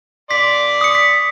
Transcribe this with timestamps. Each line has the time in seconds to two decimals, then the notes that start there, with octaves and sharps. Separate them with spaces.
0.31 D5 C6 B6
0.81 D#6 C#7
0.95 B6